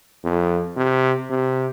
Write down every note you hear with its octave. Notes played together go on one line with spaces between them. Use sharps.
F2
C3
C3